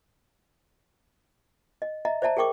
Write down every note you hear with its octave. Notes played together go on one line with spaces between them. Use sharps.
D#5
D#5 E5 A#5
C5 D5 E5 A5 A#5
G#4 A#4 G5 C#6 D6